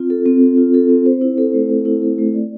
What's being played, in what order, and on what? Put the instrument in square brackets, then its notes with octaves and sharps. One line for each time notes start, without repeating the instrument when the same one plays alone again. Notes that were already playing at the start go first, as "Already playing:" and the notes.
Already playing: [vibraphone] C4 F4
A4
C4
C4
F4
A4
C4
C5
E4
A4
A3
C5
E4
A4
A3
D5